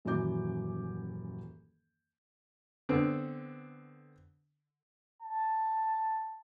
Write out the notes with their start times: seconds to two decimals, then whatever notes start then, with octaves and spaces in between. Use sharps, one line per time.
0.05 D#1 F#2 E3 C#4 D6 G6
2.89 D3 B3 C4
5.22 A5